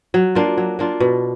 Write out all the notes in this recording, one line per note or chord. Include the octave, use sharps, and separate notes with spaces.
F#3
A#3 D4 F4
F#3
A#3 D4 F4
B2